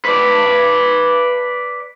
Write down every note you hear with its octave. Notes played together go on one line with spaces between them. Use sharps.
B4 D5